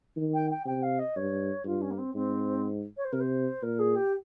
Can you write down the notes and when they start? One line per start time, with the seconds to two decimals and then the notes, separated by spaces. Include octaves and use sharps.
0.17 D#3
0.34 G5
0.50 G5
0.66 C3 G5
0.82 F5
0.99 D#5
1.16 G2 C#5
1.64 G2 F4
1.81 C#4
1.90 A#3
1.98 C4
2.15 G#2 C4
2.97 C#5
3.04 C5
3.12 C3 A#4
3.20 C5
3.63 A#2 A#4
3.79 G#4
3.95 G4